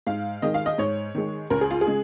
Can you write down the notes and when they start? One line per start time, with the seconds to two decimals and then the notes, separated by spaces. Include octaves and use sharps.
0.07 G#2 F5
0.42 D#3 G#3 D#5
0.54 F5
0.66 D#5
0.78 G#2 C#5
1.15 D#3 G#3
1.50 C#2 A#4
1.61 G#4
1.71 F4
1.81 G#4
1.87 C#3 G#3